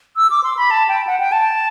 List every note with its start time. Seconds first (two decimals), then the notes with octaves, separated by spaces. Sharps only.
0.17 E6
0.30 D6
0.43 C6
0.57 B5
0.71 A5
0.89 G5
1.07 F#5
1.20 G5
1.32 A5